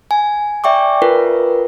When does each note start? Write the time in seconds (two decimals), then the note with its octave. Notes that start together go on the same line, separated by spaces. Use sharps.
0.11 G#5
0.64 D5 E5 G5 C#6 D6
1.02 F4 A#4 B4